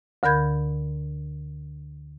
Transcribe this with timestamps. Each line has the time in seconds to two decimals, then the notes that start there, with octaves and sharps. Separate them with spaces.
0.23 D2 D3 A#4 B5 G6 G#6